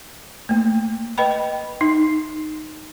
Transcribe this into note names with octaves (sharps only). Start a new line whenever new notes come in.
A3 A#3
B4 D#5 G5 B5
D#4